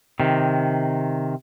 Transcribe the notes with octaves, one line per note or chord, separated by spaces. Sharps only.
C3 D#3